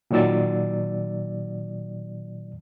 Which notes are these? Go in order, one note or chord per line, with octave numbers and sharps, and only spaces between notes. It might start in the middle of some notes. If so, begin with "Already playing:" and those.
A#2 D#3 F#3 D5 E6 A6